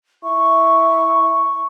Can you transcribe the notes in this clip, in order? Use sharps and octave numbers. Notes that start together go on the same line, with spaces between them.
E4 C#6